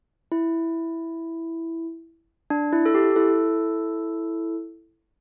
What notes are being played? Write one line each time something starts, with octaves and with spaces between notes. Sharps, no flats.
E4
D4
E4
A4
G4
E4 A4